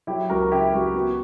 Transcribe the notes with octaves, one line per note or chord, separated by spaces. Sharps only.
F#3 E4 G4
C#2 F#4 A#4
C#3 E4 G4
C#2 F#4
B3 F#4